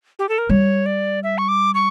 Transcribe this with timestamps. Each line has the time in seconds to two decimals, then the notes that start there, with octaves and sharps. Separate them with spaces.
0.19 G4
0.29 A4
0.38 A#4
0.49 G3 C#5
0.86 D5
1.23 E5
1.38 C#6
1.48 D6
1.75 C#6